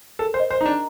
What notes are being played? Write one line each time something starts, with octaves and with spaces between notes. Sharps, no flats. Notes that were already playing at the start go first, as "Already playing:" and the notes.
A4 A#4
C5
D#5
C5
D4 D#4 A#5